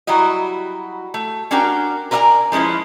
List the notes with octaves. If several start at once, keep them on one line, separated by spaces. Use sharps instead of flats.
F#3 G3 E4 F#4 D#5
A3
C#4 D4 F#4 A#4 G5
A#4 B4 D5 F5 G#5 A#5
F3 G#3 C#4 E4 B4